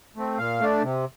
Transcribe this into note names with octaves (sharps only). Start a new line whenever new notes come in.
A3 C4
A#2 F5
A3 D4
C3